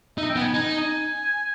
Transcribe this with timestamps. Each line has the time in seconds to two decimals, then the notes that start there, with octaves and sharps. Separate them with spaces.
0.18 D#4 E5
0.30 G5
0.36 B3
0.41 G#5
0.54 D#4 G#5